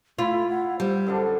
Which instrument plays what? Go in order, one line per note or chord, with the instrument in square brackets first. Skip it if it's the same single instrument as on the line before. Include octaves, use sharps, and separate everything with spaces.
[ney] A3 [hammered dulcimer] E4 B5 [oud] F4
[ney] F#5
[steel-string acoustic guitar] G3 [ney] C5
[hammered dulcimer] F#2 D3 D4